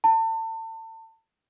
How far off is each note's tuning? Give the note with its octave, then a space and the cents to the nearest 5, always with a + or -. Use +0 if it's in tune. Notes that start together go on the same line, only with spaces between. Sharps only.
A5 +35